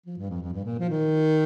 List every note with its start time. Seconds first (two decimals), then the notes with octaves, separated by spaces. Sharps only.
0.06 F3
0.18 G2
0.30 F2
0.41 F2
0.53 G2
0.65 A#2
0.79 F3
0.89 D#3